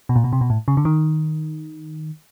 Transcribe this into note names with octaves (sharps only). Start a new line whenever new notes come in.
B2
A#2
B2
C3
B2
A2
C#3
D3
D#3